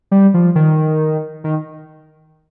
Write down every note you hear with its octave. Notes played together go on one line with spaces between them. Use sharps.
G3
F3
D#3
D#3